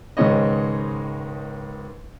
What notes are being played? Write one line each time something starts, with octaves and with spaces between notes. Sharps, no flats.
C#2 G#2 D#3 C#5 D#5